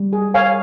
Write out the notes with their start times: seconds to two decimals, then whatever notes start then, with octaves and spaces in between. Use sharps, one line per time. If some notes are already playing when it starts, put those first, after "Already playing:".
Already playing: G3
0.13 G#4
0.34 C#5 F5 G#5